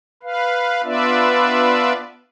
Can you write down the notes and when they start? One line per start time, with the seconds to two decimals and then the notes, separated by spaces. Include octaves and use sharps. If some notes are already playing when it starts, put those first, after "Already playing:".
0.23 B4 F5
0.84 B3 D4 F4 B4 D5 E5